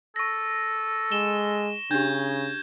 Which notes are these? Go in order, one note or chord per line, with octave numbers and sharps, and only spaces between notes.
A4 C#6 A#6
G#3 E7 G7
C#3 D4 G4 G6 G#6